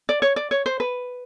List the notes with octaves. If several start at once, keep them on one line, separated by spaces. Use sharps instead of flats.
D5
C#5
D5
C#5
C5
B4